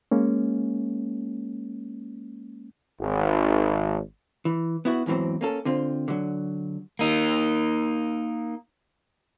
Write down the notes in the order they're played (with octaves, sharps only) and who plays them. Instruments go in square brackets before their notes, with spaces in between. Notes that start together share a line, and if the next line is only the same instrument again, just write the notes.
[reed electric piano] G#3 A#3 C#4
[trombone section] G#1
[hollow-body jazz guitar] E3
B3 E4 F#4
E2 G#2 E3 F#3 C4
A#3 C#4 A4
D3 C4 F4
D3 F#3
[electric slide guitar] A#3 D#4